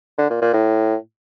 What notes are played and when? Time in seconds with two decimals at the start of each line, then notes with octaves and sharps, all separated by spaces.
0.18 D3
0.30 A#2
0.42 A#2
0.53 A2